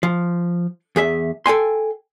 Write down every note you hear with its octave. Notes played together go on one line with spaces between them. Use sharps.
F3
E2 G#4 E5
A4 G5 G#5 C6